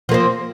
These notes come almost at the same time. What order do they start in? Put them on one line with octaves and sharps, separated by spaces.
F3 A#3 C4